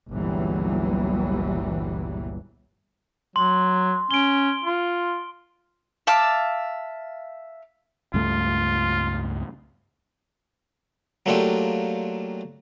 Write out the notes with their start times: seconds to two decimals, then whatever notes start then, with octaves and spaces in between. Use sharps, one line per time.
0.11 G1 C#2 A#2 E3 F#3 G3
3.36 F#3 C6
4.11 C#4 D7 G7
4.64 F4
6.07 E5 F5 A5 D6
8.14 C#2 G2 A3 F4
11.26 F#3 A3 A#3 D4 F4 G4